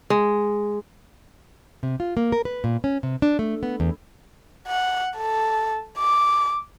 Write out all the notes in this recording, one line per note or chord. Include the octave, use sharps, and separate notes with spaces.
G#3
C3
F4
A#3
A#4
B4
A#2
C#4
C3
D4
A3
B3
E2
F#5
A4
D6